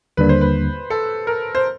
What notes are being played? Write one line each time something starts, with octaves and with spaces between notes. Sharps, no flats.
D#2 D3 G3 A#3 D4 B4
C5
B4
A4
A#4
C5